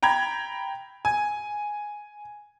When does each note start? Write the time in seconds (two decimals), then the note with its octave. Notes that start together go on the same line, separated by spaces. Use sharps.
0.03 G5 A#5 B5 G#6
1.05 G#5